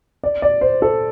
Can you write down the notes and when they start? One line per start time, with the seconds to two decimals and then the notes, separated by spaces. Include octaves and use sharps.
0.24 D5
0.42 D5
0.61 C5
0.82 A4